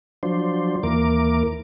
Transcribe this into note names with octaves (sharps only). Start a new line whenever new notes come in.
F3 F#3 D4 C5
D#2 E3 A#3 A#4 D6